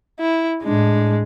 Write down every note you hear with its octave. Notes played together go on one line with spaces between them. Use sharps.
E4
A2 G#3 D4